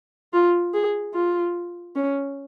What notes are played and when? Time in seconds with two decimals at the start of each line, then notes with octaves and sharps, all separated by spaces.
0.33 F4
0.73 G#4
1.14 F4
1.95 C#4